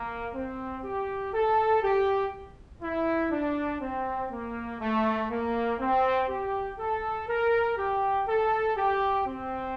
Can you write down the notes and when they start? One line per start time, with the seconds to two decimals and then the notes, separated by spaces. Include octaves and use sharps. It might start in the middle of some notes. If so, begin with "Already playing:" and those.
Already playing: A#3
0.35 C4
0.84 G4
1.34 A4
1.83 G4
2.83 E4
3.32 D4
3.82 C4
4.31 A#3
4.81 A3
5.31 A#3
5.80 C4
6.29 G4
6.79 A4
7.29 A#4
7.78 G4
8.28 A4
8.77 G4
9.27 C4